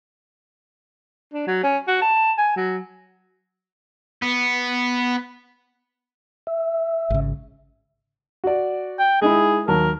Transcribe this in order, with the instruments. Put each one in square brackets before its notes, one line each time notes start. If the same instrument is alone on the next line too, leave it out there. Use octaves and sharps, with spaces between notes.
[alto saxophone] D4
F#3
C#4
F#4
A5
G#5
F#3
[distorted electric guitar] B3
[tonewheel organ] E5
[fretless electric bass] G#1 C#3
[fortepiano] F#4 D5
[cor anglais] G5
[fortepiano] G#3 D#4 E4 [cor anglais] G#4
[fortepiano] D#2 F#3 A5 [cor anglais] A#4